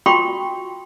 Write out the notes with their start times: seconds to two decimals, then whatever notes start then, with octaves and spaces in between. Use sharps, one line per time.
0.06 F4 F#4 G5 B5 C#6